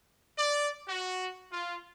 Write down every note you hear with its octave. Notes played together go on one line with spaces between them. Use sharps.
D5
F#4
F4